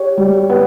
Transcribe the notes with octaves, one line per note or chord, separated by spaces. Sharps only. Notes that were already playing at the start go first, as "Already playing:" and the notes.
Already playing: G4 C#5
G3
B3